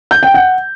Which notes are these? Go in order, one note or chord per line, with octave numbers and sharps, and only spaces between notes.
G6
G5
F#5